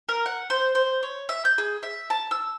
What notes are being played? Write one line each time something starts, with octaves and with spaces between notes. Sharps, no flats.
A#4
F#5
C5
C5
C#5
E5
G6
G#4
E5
A5
E6